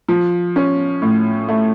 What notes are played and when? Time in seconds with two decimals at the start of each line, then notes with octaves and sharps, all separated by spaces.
0.08 F3
0.56 C#4
1.02 A2
1.48 A3